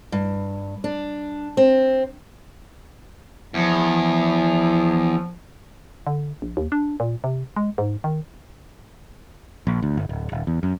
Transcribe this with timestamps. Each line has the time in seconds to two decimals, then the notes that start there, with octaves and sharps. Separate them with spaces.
0.12 G2
0.84 D4
1.57 C4
3.54 E2 F3
6.07 D3
6.42 A#1
6.57 D#2
6.72 D4
7.00 A#2
7.24 C3
7.56 G#3
7.78 G#2
8.04 D#3
9.67 A#1
9.82 D2
9.97 G1
10.09 D1
10.32 D#1
10.47 E2
10.63 F#2